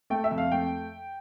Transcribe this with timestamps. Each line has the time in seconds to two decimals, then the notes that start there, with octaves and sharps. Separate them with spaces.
0.10 A3 G5
0.24 E5
0.31 F2
0.38 F5
0.52 A3 G5